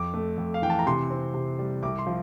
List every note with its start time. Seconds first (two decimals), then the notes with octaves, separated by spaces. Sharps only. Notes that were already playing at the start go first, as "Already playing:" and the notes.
Already playing: F2 D6
0.14 A3
0.38 F2
0.54 F5
0.62 E3 G5
0.70 A5
0.79 A#5
0.87 C3 C6
1.10 C4
1.34 C3
1.59 G3
1.83 C2 D6
1.99 C6
2.07 F3